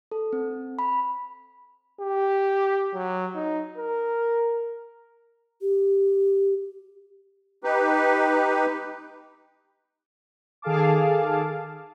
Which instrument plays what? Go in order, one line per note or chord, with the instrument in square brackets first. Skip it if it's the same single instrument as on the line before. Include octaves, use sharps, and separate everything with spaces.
[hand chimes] A4
C4
B5
[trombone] G4
F#3
D#4
A#4
[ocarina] G4
[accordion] D#4 G4 B4
[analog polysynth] D#3 G#4 A4 F5 A5 D6